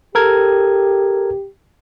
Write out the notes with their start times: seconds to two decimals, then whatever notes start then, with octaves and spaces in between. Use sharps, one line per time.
0.15 G4 A4 A#4 G#6